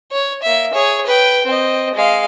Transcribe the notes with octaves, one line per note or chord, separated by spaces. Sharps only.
C#5
A#3 E5
G#4 C#5
B4 G5
C4 D#5
G#3 F5